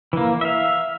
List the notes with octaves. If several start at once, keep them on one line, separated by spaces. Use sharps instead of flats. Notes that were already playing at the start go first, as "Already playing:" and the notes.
E3 A#3
E5 F5